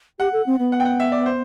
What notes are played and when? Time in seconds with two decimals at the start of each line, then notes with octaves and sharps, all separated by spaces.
0.19 G4 F#5
0.33 A4
0.46 C4
0.59 B3
0.72 F#5
0.80 G5
0.85 F#5
1.00 E5
1.12 D5
1.26 C5